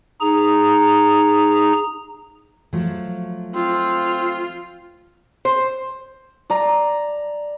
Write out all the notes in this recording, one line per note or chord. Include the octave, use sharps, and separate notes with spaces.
D#4 G#4 A#5
F3 F#3 A3
C4 F4
C5
D5 A#5